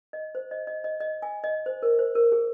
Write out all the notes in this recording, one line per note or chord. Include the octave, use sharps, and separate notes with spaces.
D#5
C5
D#5
D#5
D#5
D#5
G#5
D#5
C5
A#4
C5
A#4
G#4